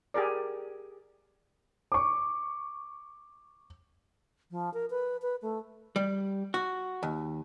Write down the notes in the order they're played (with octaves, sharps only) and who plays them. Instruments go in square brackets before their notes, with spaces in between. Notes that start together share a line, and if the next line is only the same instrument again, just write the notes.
[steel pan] G4 G#4 A#4 D5
[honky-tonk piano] C#6 D6
[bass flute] F3
A#4
B4
B4
A3
[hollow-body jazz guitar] G3
F#4
D#2